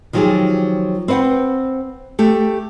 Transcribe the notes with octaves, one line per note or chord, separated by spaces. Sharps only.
D#3 F3 F#3 F4 G4 G#4
C4 B4 D5 F#5 G5
A3 G4 A4